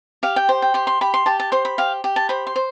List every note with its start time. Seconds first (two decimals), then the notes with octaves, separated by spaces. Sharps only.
0.23 G4 F5
0.36 G5
0.49 C5
0.62 G5
0.74 G4 C6
0.87 C6
1.01 G4 B5
1.14 C6
1.26 G4 A5
1.40 A5
1.52 C5 C6
1.65 B5
1.78 G4 F5
2.04 G4
2.16 A5
2.29 C5 B5
2.47 C6
2.56 C5